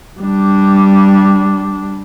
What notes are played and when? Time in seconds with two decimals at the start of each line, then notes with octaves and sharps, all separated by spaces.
0.21 G3 D4